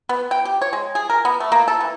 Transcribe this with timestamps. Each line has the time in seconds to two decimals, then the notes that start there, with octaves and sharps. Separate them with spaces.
0.09 B3
0.31 G5
0.45 G4
0.62 C#5
0.73 G#3
0.95 G#4
1.10 A#4
1.25 B3
1.40 A3
1.52 A#3
1.68 A4
1.80 E3